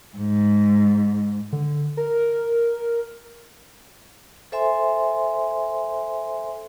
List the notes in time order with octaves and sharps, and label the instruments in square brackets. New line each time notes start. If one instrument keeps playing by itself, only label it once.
[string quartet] G#2
[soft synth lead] D3
A#4
[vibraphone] A4 C5 E5 G#5 C6